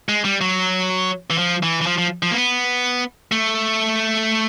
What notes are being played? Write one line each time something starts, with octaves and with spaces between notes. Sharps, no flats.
G#3
G3
F#3
E3
F3
E3
E3
F3
F3
F3
A#3
B3
A3